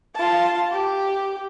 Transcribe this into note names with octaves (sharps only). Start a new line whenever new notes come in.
F4 A5
G4